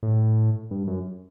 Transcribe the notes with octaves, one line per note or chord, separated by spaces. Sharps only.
A2
G2
F#2